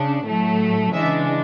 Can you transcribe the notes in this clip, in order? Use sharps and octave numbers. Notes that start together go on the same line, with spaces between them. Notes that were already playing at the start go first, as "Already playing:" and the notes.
Already playing: C#3 D4
A2 F#3 A3
C#3 E3 G#3 D4 E5